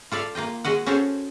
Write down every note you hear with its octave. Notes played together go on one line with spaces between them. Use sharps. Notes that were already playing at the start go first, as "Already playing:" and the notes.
F4 A4 D5 E5 F5
A#3 F4 D#5 G5
G#3 F#4 D#5 F#5
C#4 F#4 G#4 A4 C5 C#5